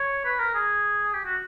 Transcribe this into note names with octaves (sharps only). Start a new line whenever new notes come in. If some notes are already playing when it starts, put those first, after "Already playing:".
Already playing: C#5
B4
A#4
G#4
G4
F#4